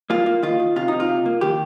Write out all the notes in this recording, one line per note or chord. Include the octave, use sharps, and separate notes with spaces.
A#3 F4
A#3
D#3 F4
D#3
C3 F4
C3 D#4
F4
C3
A#3
D#3 G4